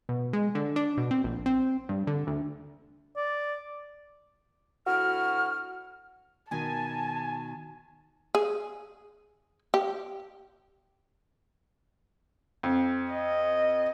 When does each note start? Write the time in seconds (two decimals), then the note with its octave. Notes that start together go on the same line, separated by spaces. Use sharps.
0.09 B2
0.33 G#3
0.55 D3
0.76 D4
0.98 B2
1.11 C4
1.24 A#1
1.46 C4
1.89 G2
2.07 D3
2.27 D2
3.17 D5
4.87 D2 E4 F#4 F6
6.51 B2 D#3 G#5 A5
8.35 G#4
9.74 G4
12.63 F2
13.13 D#5